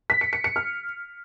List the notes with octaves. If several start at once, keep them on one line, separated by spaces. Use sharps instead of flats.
B6
C#7
C#7
C#7
F6